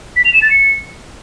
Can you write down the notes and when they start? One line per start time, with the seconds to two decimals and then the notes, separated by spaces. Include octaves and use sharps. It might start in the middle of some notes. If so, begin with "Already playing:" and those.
0.16 B6
0.25 F7
0.33 E7
0.42 A6
0.51 C#7